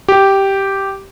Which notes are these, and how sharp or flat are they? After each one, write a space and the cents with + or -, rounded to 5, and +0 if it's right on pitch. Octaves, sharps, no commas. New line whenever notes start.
G4 -5